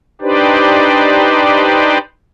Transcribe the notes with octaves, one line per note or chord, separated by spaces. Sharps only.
D4 D#4 G4 B4 C5 D5